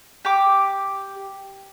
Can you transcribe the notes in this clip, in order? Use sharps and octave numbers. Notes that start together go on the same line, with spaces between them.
G4 D6